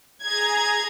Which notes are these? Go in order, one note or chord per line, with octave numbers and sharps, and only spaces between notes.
G#4 A#5 G#6